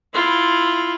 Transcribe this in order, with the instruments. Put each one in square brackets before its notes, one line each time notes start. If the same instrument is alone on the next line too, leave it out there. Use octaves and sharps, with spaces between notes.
[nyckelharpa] E4 F4